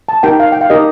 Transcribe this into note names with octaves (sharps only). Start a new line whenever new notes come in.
A5
D#4 G4 A#4 G5
F5
G5
F5
D#4 G4 A#4 D#5